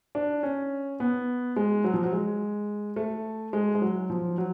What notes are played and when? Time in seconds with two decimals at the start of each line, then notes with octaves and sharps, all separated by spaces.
0.15 D4
0.43 C#4
1.00 B3
1.56 G#3
1.84 F#3
1.94 F3
2.03 F#3
2.13 G#3
2.96 A3
3.53 G#3
3.75 G#3
3.82 F#3
4.10 F3
4.38 F#3